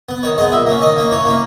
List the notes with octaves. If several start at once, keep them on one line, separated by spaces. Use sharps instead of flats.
B3
D#3 C#5
G#3 B3 D#5
A#2 E5
A#3 C#4
D#3 D#5
A#3 C#4
E3 C#5
A#3 C#4